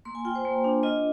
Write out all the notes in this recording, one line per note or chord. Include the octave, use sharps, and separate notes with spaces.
A#3 C6
G#5
F4 G5
C5
A#3
D4
F4 D#5